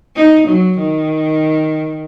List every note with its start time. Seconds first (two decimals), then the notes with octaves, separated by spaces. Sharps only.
0.16 D#4
0.48 F#3
0.79 D#3